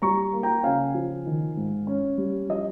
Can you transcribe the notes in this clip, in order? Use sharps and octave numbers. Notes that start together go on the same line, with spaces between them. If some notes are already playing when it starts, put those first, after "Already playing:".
G3 A#5 C#6
A#3
G5 A#5
C#3 F5 G#5
F3
D#3
G#2
C#4
G3
F3 D#5